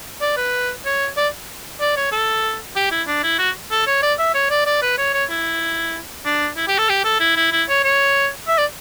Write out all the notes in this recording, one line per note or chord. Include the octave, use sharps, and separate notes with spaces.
D5
B4
C#5
D5
D5
C#5
A4
G4
E4
D4
E4
F#4
A4
C#5
D5
E5
C#5
D5
D5
B4
C#5
C#5
E4
D4
E4
G4
A4
G4
A4
E4
E4
E4
C#5
C#5
E5
D5